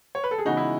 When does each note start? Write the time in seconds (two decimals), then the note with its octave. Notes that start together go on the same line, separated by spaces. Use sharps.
0.15 C#5
0.24 B4
0.31 A4
0.38 G#4
0.45 C#3 E3 G#3 B3 D#4 F#4
0.57 E4